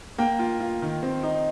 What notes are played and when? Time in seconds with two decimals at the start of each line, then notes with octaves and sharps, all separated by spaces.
0.18 A#3 G5
0.39 F4
0.60 F4
0.82 D#3
1.03 C4
1.23 D#4